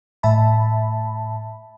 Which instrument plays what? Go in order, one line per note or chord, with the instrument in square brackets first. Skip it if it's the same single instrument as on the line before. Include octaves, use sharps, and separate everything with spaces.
[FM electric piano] A2 E5 A5 B5